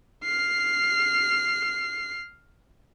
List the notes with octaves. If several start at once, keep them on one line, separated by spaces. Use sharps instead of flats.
F6 C7